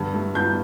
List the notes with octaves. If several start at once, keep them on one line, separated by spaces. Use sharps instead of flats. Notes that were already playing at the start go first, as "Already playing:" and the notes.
Already playing: G2 D3
A3
G2 G6